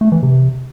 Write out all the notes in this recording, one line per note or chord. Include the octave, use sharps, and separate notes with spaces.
A3
E3
C3